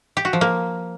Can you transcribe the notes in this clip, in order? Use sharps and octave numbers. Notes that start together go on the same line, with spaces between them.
G4
F#4
F3
A#3